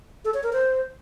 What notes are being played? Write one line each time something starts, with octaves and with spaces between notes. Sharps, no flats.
A4
C#5
A#4
C5